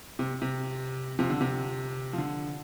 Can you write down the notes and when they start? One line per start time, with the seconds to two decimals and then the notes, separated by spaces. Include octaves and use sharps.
0.19 C3
0.42 C3
1.19 C3 F3
1.30 D3
1.41 C3
2.13 F3
2.18 D3